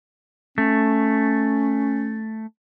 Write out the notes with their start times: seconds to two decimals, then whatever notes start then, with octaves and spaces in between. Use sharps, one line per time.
0.58 A3 C#4